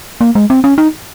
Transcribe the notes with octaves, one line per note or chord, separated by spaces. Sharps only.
A#3
G#3
C4
C#4
D#4